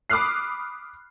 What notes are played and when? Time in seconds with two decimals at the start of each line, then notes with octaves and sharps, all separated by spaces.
0.10 B5 D6 D#6 F6 F#6 C7